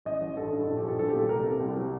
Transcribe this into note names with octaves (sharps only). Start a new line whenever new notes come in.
A1 D#5
A1
G2 A4
G2
A#1 A4
G4
A#1
A4
F#3 A4
G4
A#2 A4
C2 A#4
A4
C3
G4
C2
F#3